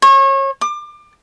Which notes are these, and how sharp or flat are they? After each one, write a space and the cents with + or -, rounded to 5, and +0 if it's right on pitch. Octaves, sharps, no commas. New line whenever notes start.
C#5 -30
D6 +30